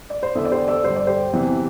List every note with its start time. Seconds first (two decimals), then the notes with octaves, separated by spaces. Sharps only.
0.10 D5
0.23 C5
0.35 E2 D3 E4 A4
0.45 D5
0.51 G4 C5
0.68 A4 D5
0.84 G2 D3 C5
0.96 D5
1.07 G4 C5
1.33 E2 C3 E3